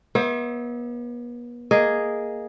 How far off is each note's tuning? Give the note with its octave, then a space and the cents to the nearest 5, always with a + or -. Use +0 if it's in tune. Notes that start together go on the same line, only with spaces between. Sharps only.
B3 -40 C5 +35 E5 -35
A#3 +0 G#4 +0 D#5 +0